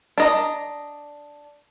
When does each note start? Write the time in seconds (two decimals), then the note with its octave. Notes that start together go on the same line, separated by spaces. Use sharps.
0.18 D4 D#5 A#5